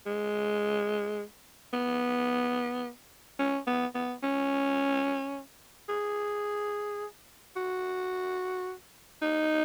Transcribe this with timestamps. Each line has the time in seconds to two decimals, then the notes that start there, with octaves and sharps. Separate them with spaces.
0.06 G#3
1.73 B3
3.39 C#4
3.67 B3
3.95 B3
4.23 C#4
5.89 G#4
7.56 F#4
9.22 D#4